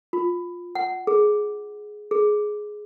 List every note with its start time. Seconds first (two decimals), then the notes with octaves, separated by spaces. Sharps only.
0.13 F4
0.75 F#5
1.07 G#4
2.11 G#4